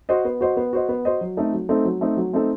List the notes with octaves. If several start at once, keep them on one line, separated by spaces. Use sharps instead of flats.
F#4 C5 D#5
B3
F#4 C5 D#5
B3
F#4 C5 D#5
B3
F#4 C5 D#5
F#3
A3 C4 D#4 A4
F#3
A3 C4 D#4 A4
F#3
A3 C4 D#4 A4
F#3
A3 C4 D#4 A4